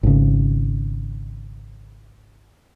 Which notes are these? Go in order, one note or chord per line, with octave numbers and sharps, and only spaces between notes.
G#1 C#3